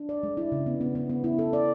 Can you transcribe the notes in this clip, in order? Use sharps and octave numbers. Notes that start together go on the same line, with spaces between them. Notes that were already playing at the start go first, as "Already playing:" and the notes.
Already playing: D4
D5
G#3
E4
C#3
B3
B3
B3
B3
E4
A4
D5